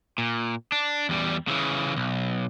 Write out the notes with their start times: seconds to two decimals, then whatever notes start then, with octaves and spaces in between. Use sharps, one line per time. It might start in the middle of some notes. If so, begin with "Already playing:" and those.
0.18 A#2
0.72 D4
1.09 E2 G3
1.48 C#3 E3
1.97 B1